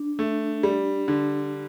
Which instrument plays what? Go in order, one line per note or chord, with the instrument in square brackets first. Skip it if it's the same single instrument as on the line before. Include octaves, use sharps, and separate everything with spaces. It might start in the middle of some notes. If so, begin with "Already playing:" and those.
Already playing: [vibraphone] D4
[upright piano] A3
G3
D3